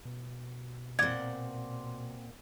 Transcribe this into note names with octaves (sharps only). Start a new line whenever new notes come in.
B2
A#2 C4 D5 F#5 G#6